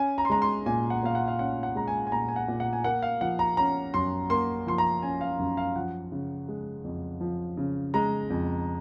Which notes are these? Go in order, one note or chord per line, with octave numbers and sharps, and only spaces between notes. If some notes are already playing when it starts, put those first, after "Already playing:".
Already playing: C#4 G#5
A#5
C6
G#3 A#5
C6
A#2 G#5
F#5
A#2 F5
F#5
F5
C#4 F#5
F#5
G#3 A#5
G#5
G#5
A#2 A#5
G#5
F#5
A#2
F#5
G#5
A#3 F#5
F5
F3 F#5
A#5
C#4 A#5
F#2 C6
A#3 C6
F3 C6
A#5
C#4 G#5
F5
F#2
F5
F3 F#5
C#3
G#3
F2
F3
C#3
G#3 A#5
F2